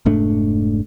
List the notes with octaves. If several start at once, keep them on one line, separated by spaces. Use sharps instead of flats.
F1 G#2 A3 D4